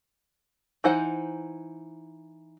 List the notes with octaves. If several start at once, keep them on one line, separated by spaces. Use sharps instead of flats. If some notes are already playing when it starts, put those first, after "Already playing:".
E3 D#4 C5 F#5